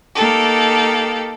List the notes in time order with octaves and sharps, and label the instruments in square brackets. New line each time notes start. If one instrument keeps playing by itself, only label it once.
[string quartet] A#3 D#4 G4 A4